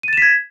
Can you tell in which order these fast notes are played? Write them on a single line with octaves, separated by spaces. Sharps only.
D#7 A6 E7 B6 G#6